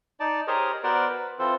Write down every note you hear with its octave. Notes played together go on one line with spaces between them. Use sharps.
D#4 D5 A5
G4 G#4 A#4 C5 C#5 D#5
B3 F#4 A#4 C5 D5
B4
E3 C4 F4 A4 C5